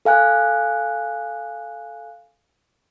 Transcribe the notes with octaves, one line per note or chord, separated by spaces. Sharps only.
A4 F5 G#5 F#6